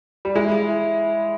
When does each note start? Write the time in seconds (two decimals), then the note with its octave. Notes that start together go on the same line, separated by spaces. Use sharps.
0.25 G3
0.35 G#3 E4
0.52 F5
0.68 E4